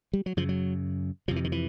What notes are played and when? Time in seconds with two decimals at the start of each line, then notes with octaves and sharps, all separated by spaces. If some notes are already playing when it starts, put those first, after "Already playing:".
0.13 G3
0.26 F#3
0.37 F#2 C#3 F3
0.49 F#3
1.28 F2 C3 F3
1.36 E3
1.44 D#3
1.52 E3